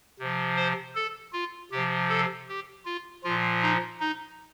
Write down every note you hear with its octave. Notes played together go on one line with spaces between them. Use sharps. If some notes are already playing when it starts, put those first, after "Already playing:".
C3 F3
C5
A4
F4
C3 F3 G4
A4
G4
F4
A#2 F3 F4
D#4
D#4